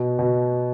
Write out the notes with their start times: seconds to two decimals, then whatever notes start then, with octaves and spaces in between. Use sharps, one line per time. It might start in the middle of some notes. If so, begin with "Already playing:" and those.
Already playing: B2
0.19 B2